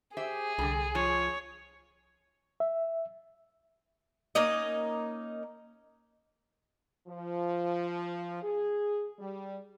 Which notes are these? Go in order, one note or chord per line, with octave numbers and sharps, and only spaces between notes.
G4 G#4 C5 E5
C2 D3 G3
F3 F4 C#5
E5
A#3 C#4 D#4 D#5
F3
G#4
G3